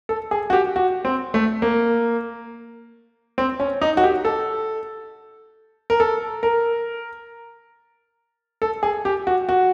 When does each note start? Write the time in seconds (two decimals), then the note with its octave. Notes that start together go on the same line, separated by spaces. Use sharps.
0.09 A4
0.31 G#4
0.50 F#4
0.53 G4
0.76 F#4
1.05 C4
1.34 A3
1.62 A#3
3.38 C4
3.60 C#4
3.81 D#4
3.97 F#4
4.03 G4
4.25 A4
5.90 A#4
6.00 A4
6.43 A#4
8.62 A4
8.83 G#4
9.05 G4
9.27 F#4
9.49 F#4